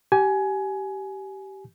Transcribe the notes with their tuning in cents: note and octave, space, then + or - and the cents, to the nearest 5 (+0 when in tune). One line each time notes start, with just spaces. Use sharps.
G4 -20 G#5 +15